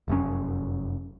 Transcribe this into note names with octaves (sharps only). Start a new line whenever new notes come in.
F1 F#2 A2 C#4